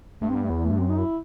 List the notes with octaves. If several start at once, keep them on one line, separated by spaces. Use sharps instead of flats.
G2 A3
C4
B3
A3
E2 B3
A3
G2
F#2 C4
D#4
E4